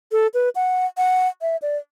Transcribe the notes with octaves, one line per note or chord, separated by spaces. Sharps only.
A4
B4
F#5
F#5
E5
D5